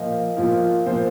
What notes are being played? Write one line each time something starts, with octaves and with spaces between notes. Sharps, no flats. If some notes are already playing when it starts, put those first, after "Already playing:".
Already playing: A#2 F3 D#5
A#2 F3
A#2 F3 C5